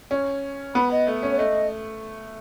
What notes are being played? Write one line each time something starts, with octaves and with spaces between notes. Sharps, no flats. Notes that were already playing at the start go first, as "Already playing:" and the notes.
C#4
B3 B5
D#5
A3
C#4
C#5
A3 D#5